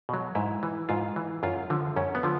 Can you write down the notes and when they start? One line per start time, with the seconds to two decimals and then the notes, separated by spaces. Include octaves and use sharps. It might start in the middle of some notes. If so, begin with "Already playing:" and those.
0.09 B2 F#3
0.35 G#2 E4
0.63 E3
0.89 G#2 F4
1.16 E3
1.43 F#2 F4
1.70 D3 F3
1.96 F#2 C#4
2.15 B3
2.23 D3 F3